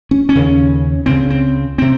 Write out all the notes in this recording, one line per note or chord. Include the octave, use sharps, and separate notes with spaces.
C#4
C#4
D#2 C#3
C#2 C#3 C4
C4
C3 C4